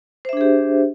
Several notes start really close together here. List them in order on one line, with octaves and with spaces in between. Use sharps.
C5 E5 D4 G#4 G4